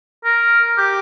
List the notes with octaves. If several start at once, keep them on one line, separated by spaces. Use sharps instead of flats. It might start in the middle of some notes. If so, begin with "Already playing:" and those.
A#4
G4